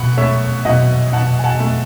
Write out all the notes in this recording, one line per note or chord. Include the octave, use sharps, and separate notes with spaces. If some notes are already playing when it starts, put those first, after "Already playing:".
Already playing: B2 F#5 B5
A3 C#5 E5
B2 D#5 F#5
B2 F#5 A5
G#5
F#5 A5
A3